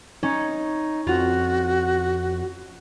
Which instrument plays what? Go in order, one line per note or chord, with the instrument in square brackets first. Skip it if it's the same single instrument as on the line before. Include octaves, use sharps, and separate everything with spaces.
[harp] C#4 [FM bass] D#4
[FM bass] F2 [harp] F4 [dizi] F#4